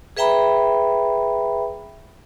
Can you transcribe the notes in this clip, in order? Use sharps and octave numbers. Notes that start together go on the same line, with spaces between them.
G#4 B4 E5 G5 A#5 B5